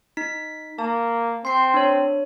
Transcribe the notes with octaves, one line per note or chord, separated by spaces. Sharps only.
D#4 B6
A#3 A5
C4 C6 C7
D4 C#5